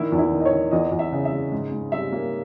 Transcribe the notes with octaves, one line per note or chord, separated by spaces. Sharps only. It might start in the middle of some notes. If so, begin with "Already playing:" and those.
Already playing: A#2 D#3 E4
E2
E4
D#3
D#5
C#5
D#3
E2 D#5
E2
E5
C#3
E5
G#3
G#2
G#2
G3 E5
A#3